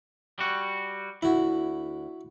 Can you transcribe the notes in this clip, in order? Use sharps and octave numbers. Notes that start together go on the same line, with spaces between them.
G3 F#4
D2 E4 F#4